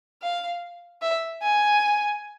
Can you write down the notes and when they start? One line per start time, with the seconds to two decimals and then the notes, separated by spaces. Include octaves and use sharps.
0.22 F5
1.02 E5
1.42 G#5